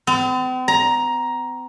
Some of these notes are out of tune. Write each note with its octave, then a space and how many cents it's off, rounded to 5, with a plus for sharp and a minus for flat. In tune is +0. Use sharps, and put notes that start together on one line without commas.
C4 -45
A#5 +10